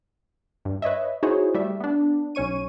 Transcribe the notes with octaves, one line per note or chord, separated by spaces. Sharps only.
G2
B4 C#5 D#5 E5
D#4 E4 F#4 G#4 C5 C#5
G3 A3 E5
B3 D4
B1 C#4 C#5 C#6 D#7